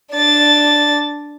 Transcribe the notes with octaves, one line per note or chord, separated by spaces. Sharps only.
D4 A6